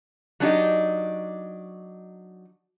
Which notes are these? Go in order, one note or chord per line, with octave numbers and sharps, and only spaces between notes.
F#3 A3 D4 D#4 G4 D#5